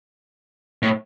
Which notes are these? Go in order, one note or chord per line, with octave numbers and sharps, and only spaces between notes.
A2